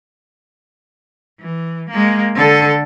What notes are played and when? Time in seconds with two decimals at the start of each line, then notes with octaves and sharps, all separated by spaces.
1.41 E3
1.91 G#3 A#3
2.35 D3 A4